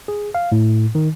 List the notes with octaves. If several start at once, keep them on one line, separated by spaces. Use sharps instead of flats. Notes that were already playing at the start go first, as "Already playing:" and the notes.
G#4
F5
A2
D#3